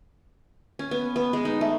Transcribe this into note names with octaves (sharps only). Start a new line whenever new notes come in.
C#4
B3
B3
G#3
D#4
A3